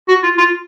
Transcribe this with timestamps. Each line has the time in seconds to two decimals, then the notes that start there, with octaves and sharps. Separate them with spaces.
0.08 F#4
0.23 F4
0.38 F4